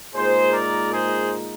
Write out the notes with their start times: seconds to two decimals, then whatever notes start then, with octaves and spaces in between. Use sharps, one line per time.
0.14 A#2 G#3 D#4 G#4 C5
0.53 A#4 D5
0.92 G#4 C5